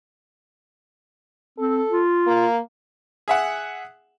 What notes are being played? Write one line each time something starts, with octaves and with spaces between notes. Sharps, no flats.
C4 A4
F4
A#3
G#4 E5 F#5